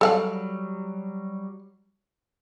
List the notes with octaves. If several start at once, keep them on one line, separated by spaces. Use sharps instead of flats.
F#3 G3 A4 F5 F#5